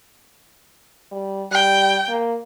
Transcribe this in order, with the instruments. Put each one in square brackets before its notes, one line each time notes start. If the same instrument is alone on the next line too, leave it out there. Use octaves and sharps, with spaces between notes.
[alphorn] G3
[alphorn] G3 [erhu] G5
[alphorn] A#3